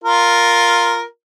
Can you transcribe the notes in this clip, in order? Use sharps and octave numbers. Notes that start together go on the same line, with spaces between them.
F4 A#4